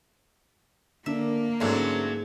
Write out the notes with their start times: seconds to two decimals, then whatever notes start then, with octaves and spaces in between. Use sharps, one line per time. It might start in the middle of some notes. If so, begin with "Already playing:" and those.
1.06 D3 A#3 D4 A#4 E5
1.60 G#2 D3 F#3 A3 B3 C#4 D4 C6